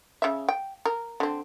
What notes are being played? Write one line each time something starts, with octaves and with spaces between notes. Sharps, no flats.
C#3 E5
G5
A#4
D3 C4